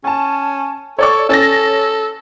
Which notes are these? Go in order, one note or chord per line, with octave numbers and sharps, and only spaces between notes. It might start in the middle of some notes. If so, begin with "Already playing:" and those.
C#4 G#5 A5
A4 C#5 D5 C#6
C#4 A4 A6 A#6